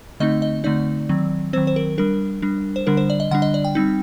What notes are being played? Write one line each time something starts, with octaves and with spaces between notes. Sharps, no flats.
D3 A3 C4 D#4 D#5
D#5
D3 A3 C4 D#4 D5
D#3 F#3 C4
D#3 F#3 C4 C5
C5
A#4
G3 D4 A#4
G3 D4
C5
D3 G3 D4 A#4
C5
D5
D#5
D3 G3 D4 F#5
D#5
D5
G5
G3 C4 D#4